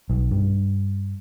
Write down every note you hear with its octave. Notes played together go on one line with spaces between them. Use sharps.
B1
G2